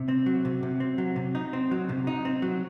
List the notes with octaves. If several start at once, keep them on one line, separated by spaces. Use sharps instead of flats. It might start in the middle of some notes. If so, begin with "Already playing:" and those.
Already playing: C3
C4
F#3
C3
C3
C4
F#3
C3
D#4
C4
F#3
C3
D#4
C4
F#3